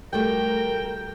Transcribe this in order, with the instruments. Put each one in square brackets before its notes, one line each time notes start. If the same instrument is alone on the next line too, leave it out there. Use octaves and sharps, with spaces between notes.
[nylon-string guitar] G3 A3 F#4 [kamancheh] A#4 [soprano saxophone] G5